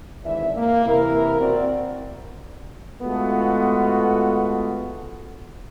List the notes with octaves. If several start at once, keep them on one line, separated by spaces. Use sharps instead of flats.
G#1 E3 D4 E5
A#3
C3 E3 E4 A#4
C4 F#4 D5
G#3 A3 B3 F4 F#4 A4